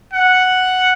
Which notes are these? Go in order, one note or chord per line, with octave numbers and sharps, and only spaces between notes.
F#5